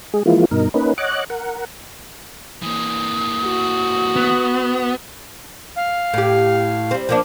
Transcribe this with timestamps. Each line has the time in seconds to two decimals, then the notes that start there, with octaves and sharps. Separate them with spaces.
0.14 G#3 G#4
0.26 E3 F3 G#3 A#3 E4 F4
0.51 G2 B2 D#4 A#4
0.74 A#3 C#4 D#4 B4
0.98 C#5 D#5 F#5 D6 F#6
1.30 A#4 F#5
2.63 E3 A#3 D#6
3.45 F#4
4.16 B3
5.76 F5
6.14 A2 G4
6.91 G3 C4
7.09 F3 A#3 D4